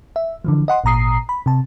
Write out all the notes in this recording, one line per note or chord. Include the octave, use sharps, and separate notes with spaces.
E5
D3 E3 F3
D#5 F#5 C6
G#1 A#2 A#5 D#6 C7
B5
C3 A5